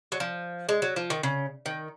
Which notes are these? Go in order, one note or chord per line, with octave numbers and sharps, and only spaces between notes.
F#3
F3
G#3
F#3
F3
D#3
C#3
D#3